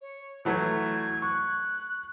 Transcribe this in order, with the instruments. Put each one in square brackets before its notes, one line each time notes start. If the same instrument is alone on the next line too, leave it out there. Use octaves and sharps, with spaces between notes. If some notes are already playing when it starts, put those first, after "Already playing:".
[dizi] C#5
[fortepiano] E3 F#3 A3 [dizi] G#6
[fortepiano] C#6 [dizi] F#6